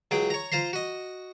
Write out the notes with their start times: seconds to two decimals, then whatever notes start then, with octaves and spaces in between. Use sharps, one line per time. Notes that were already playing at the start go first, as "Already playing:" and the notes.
0.11 C#2 F#3 G#4 G5
0.30 C#5 A#5
0.52 F4 C5 A#5 C6
0.73 F#4 D#5